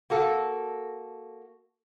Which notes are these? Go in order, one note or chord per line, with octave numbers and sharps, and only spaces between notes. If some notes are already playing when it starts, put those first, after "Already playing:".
A#3 F#4 A4